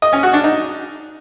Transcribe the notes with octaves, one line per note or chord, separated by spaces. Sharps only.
D#5
C#4
F#4
D4
D#4